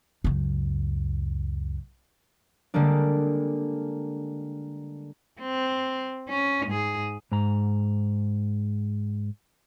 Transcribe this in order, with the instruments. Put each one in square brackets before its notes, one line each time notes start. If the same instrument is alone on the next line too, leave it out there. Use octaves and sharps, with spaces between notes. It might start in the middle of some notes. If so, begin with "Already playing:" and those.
[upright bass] C#2 F#2
[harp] D3 G3 G#3 A#3 D4
[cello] C4
C#4
G#2 G#4
[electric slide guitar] G#2 A#5